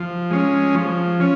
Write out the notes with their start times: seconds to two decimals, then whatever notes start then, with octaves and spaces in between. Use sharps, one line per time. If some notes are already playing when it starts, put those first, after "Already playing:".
Already playing: F3
0.30 G#3 C#4
0.75 F3
1.20 C#4